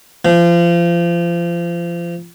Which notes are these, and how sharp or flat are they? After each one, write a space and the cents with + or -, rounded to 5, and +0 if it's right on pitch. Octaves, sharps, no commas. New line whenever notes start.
F3 -30